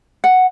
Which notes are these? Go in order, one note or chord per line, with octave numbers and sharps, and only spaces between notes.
F#5